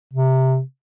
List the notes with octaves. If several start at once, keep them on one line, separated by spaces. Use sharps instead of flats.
C3